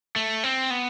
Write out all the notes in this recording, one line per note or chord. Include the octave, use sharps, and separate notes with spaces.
A3
C4
B3